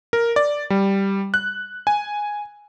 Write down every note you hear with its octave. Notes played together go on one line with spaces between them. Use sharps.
A#4
D5
G3
F#6
G#5